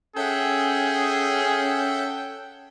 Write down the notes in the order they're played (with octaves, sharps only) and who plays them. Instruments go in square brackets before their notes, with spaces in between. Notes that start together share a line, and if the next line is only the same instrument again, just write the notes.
[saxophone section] C#4 [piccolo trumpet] G#4 [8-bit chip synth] A4 E5 F#5 [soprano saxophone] G5